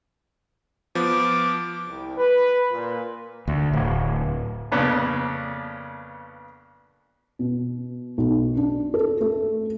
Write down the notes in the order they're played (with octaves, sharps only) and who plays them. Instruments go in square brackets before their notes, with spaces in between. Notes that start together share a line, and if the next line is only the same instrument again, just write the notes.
[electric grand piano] F3 B3 [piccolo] D6
[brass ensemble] C2
B4
A#2
[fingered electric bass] D2
D1
[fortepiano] F2 A#2 C#3 B3 D4
[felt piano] B2
B1
D4
A4
A3